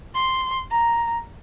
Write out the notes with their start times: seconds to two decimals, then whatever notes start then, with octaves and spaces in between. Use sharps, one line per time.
0.15 C6
0.71 A#5